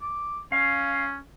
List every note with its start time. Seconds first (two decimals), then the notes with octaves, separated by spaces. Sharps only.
0.02 D6
0.52 C#4 F5